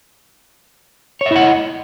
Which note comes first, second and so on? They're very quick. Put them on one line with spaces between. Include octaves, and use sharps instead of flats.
C#5 E5 E4 F#5 D#5